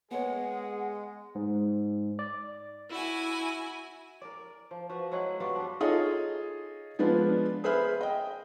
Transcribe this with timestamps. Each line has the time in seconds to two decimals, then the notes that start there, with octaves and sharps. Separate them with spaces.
0.11 G#3 B3 G#4 C#5 F#5
1.35 G#2
2.19 D5
2.90 E4 F#4 G#5
4.21 A#4 D5
4.71 F3
4.89 F3 F#4 B4
5.12 F#3 G#3 E4 F#5
5.40 G3 B3 F4 F#4
5.55 D4 B4
5.80 D#4 F4 G#4 A4 C#5 D#5
6.99 F3 G#3 B3 D4 F4
7.64 G#4 B4 C5 E5 B5 F6
8.01 D#5 G5